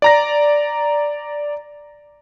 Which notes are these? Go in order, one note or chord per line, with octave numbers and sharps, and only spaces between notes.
D5 A#5 A#6